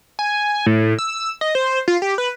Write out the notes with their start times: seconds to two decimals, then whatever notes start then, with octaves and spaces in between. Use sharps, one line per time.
0.19 G#5
0.66 A2
0.99 E6
1.41 D#5
1.55 C5
1.88 F4
2.02 G4
2.18 B4